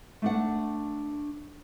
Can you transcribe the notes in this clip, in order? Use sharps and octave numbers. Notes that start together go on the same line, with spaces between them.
A3 D4 F#5